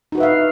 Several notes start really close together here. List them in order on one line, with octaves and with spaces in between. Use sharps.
D#4 F#4 B4 E5 F5